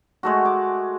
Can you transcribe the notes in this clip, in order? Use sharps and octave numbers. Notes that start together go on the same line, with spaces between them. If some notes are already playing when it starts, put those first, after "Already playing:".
G#3 A3 F#4
D6